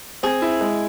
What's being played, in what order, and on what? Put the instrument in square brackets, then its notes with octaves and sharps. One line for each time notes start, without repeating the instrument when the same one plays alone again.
[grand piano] C4 [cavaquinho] G#4
[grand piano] E4
G#3